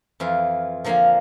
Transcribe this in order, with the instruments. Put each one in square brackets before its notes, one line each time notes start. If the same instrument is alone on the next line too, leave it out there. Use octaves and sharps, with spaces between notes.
[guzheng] F2 E3 F4
D3 F3 A#3 A#4 F5 G#5